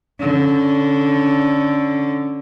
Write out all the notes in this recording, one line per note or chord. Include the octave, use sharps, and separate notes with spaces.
D3 C#4